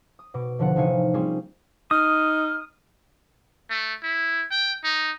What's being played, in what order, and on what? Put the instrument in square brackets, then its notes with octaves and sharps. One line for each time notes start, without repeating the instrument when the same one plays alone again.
[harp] D#6
B2 D6
E1 D3 F3 D4 F#5
A1 C3 D#4 F5 G#5 C#7
G3 A#3 C4 C#4 F4 G#4
[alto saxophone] D#4 [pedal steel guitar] D#6 [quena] F6
[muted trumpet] A3
E4
G5
D#4